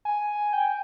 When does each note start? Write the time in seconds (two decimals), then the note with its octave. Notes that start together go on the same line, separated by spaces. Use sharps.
0.05 G#5
0.53 G5